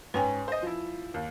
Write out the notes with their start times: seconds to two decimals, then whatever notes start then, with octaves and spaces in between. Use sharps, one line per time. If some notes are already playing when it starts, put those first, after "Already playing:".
0.14 G#2 C#4 B4 G5 G#5
0.48 C5 D#5
0.62 F3 E4
1.14 D#2